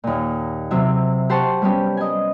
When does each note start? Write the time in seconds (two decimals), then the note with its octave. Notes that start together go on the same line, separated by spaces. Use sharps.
0.04 D#2 A#2
0.71 C3 F#3 E5
1.30 G4 C5 F#5 A5 C6 C#6
1.62 G3 B3 C#4 G4
1.97 D#5 G#5